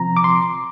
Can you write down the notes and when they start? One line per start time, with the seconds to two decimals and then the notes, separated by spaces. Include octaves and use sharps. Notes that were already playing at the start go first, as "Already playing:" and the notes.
Already playing: C3 F3 C4 A#5
0.17 D6
0.24 C6